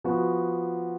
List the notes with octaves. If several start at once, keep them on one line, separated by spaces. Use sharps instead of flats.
F3 B3 F#4